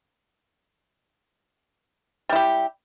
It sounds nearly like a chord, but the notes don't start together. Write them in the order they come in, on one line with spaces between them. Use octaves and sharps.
G3 E4 G4